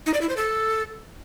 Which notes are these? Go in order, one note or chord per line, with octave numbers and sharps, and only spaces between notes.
D#4
D5
E4
C5
A4